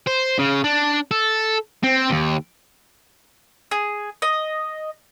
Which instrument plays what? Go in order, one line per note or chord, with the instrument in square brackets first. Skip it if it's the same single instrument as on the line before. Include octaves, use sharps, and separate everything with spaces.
[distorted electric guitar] C5
C#3
D4
A4
C4
D#2
[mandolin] G#4
D#5